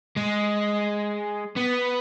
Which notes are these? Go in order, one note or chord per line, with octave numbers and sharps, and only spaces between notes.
G#3
B3